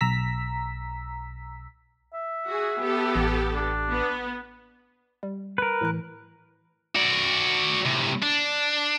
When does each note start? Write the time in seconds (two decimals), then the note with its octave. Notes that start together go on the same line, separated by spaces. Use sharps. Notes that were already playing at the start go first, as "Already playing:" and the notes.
0.01 B1 A#5 E6 B6
2.14 E5
2.47 F#4 G#4
2.80 B3 G4 A4
3.16 A1
3.54 D4
3.90 B3
5.23 G3
5.58 A#4 B4
5.81 A2 E3 F#6
6.95 F#4 D5
7.86 A2 C3
8.23 D4